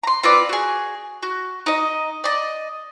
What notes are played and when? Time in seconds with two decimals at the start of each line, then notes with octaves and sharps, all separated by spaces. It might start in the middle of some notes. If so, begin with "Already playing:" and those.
0.03 A#5 C6
0.23 C4 F4 B4 D5
0.49 F#4 G#4
1.23 F#4
1.66 D#4 D#5
2.24 D5 D#5